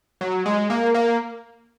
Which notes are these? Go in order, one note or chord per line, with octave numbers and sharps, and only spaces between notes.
F#3
G#3
A#3
A#3